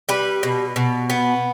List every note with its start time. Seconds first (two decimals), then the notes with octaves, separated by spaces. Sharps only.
0.09 G3 B4
0.43 B2
0.76 B2
1.10 B3